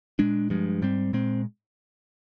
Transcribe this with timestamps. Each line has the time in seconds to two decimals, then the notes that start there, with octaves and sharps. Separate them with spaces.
0.19 A#2 G#3 D4
0.50 G2 F3 G#3
0.82 G#2 G3 C4
1.13 A#2 G#3 C4